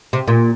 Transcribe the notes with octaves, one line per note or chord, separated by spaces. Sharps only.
C3
A#2